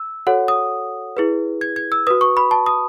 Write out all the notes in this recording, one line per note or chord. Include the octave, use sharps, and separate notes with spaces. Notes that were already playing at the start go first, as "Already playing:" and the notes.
Already playing: E6
F#4 A4 C#5 F#5
D#6
E4 G#4 B4
G#6
G#6
E6
F#4 B4 D#6
C#6
B5
A5
D#6